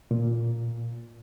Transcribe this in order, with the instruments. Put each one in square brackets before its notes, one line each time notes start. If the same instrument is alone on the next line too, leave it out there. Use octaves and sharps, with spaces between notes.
[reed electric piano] A#2